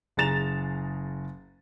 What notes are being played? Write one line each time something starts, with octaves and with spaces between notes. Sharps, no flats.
F#1 G#4 A#5 A6 E7 F7